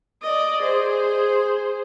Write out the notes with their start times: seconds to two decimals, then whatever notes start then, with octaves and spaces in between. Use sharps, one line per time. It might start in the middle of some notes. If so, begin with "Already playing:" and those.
0.22 D5 D#5
0.62 G#4 C5